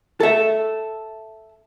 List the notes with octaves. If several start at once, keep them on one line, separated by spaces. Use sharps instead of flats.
A4 E5